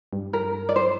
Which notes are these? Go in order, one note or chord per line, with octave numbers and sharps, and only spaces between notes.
G2
A#4
D5
C5